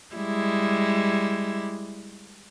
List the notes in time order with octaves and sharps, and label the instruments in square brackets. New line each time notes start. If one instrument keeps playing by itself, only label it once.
[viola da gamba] G3 G#3 E4